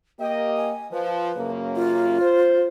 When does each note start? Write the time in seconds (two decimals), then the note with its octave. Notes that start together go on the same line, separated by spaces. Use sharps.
0.19 A#3 G4 D#5 G5
0.57 G#5
0.92 F3 B4
1.36 F#2 C#3 A#3
1.76 F4
2.21 C5